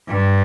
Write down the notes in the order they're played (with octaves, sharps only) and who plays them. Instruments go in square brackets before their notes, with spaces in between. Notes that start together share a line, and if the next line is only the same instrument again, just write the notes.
[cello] G2